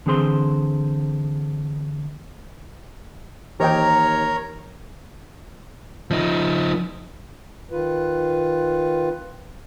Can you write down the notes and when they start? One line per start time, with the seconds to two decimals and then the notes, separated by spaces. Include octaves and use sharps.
0.06 D3 E3 C4 G#4 C5 C6
3.60 D#2 E3 G4 A#4 C#5 D#5 G5 A#5
6.11 F3 D#4
7.72 D#3 F4 B4